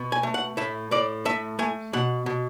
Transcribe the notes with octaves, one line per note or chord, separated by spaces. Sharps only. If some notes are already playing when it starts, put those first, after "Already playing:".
Already playing: B2
G#5
A3
F#5
A2 E5
A2 D5
A3 E5
A3 G#5
B2 F#5
B2